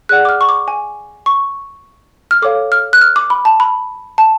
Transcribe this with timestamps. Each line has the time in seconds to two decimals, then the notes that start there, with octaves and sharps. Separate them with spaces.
0.09 G#4 D5 F#5 F#6
0.25 D6
0.29 F6
0.41 C#6
0.49 D6
0.68 G#5
1.26 C#6
2.31 F6
2.42 A4 C#5 F5 D6
2.72 F6
2.93 F#6
3.01 F6
3.16 D6
3.30 B5
3.45 A5
3.60 B5
4.18 A5